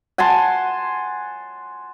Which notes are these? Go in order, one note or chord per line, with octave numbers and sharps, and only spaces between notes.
F#5 G#5 A5 C6